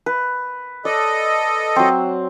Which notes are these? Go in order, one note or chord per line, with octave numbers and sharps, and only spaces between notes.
B4
A4 D5 D#5
F#3 C4